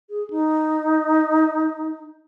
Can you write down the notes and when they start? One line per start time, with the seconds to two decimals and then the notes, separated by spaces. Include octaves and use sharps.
0.10 G#4
0.30 D#4